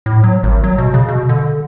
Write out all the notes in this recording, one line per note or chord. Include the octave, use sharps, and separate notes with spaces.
A2
F#3
G#1
F#3
B2
C#3
B2
D3